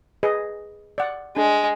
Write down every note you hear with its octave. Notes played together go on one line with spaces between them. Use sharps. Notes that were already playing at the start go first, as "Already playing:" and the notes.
G#4 B4 D#5
D5 F#5
G#3 D4